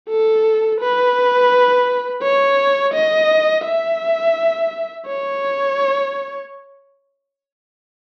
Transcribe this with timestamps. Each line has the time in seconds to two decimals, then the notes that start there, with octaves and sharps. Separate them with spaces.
0.09 A4
0.81 B4
2.23 C#5
2.94 D#5
3.65 E5
5.07 C#5